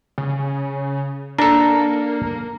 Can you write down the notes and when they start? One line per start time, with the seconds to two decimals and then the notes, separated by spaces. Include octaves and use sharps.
0.18 C#3
1.38 A#3 D4 A4 A#5